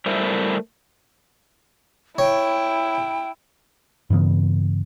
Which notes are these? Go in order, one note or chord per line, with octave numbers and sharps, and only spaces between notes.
G3 A3 A#3 E4 A#4 C5
E4 C#5 G5
G2 C#3 E3 B3